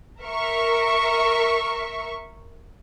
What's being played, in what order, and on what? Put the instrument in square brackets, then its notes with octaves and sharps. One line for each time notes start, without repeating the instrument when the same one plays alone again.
[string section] A#4 E5 C#6